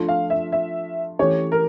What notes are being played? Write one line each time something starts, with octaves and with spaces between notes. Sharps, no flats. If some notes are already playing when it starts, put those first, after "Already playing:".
Already playing: F3 A3 D4 F4
F5
E5
E5
E3 A3 C#4 G4 C#5
A#4